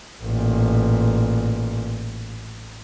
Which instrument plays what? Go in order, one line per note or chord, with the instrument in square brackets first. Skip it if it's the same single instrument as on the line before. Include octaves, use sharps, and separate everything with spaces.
[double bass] A1 A#2